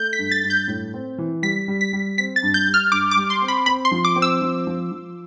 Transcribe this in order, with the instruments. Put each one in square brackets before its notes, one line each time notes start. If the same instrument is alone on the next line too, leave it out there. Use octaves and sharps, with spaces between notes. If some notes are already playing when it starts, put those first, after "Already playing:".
Already playing: [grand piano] A3 [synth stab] G6
[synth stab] B6
[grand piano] G2
[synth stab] A6
[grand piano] G2
[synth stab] G6
[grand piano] A2
C4
E3
[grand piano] G3 [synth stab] B6
[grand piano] G3
[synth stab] B6
[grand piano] G3
[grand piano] C4 [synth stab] B6
[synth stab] A6
[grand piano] G2
[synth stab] G6
[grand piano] G3
[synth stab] F6
[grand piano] G2 [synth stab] D6
[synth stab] D6
[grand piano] G3
[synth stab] C6
[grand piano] C4
[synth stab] B5
[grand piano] C4 [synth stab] B5
[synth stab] C6
[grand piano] F3
[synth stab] D6
[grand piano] C4
[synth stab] E6
[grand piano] F3
F3
F3